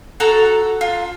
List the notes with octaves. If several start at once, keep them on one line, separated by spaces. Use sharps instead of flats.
F#4 A4 A#5 E6
F4